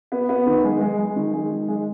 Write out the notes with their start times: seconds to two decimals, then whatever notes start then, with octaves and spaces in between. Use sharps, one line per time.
0.12 B3
0.29 B3
0.46 D#3
0.64 G#3
0.81 G#3
0.99 G#3
1.16 D#3
1.34 G#3
1.51 D#3
1.68 G#3